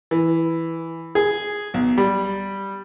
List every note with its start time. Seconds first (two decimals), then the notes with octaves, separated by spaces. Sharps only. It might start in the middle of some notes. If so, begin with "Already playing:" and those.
0.11 E3
1.15 G#4
1.74 B1
1.98 G3